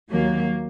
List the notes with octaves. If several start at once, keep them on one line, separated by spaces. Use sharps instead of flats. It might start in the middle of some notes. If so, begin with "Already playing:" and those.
D#2 D#3 F#3 A#3